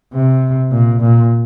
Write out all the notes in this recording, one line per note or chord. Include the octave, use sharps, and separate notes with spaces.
C3
A#2
A#2